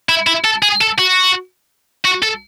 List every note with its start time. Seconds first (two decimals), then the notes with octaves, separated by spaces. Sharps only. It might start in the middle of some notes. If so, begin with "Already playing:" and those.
0.09 E4
0.27 E4
0.45 A4
0.63 G#4
0.81 A4
0.98 F#4
2.05 F#4
2.23 A4